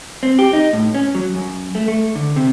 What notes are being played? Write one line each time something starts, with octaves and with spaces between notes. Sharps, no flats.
C4
G4
D#4
A2
C#4
F#3
F#2
A3
A3
D3
C3